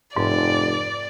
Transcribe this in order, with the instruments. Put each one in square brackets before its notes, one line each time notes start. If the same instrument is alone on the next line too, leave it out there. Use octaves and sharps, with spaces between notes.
[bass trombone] F1 [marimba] G#2 [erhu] D5